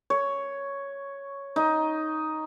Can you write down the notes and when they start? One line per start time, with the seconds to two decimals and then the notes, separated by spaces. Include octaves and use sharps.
0.10 C#5
1.56 D#4